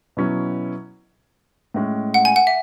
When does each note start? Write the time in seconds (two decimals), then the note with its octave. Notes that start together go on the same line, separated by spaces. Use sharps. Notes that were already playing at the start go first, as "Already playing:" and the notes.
0.17 B2 F#3 C#4 E4
1.74 A2 G#3 C#4
2.14 F#5
2.25 G#5
2.36 F#5
2.47 E5